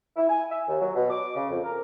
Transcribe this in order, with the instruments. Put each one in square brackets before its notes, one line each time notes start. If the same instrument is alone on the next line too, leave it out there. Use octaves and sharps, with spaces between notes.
[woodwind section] E4
G#5
E5
D#2
F#3
B2
D6
C#3
F2
A#4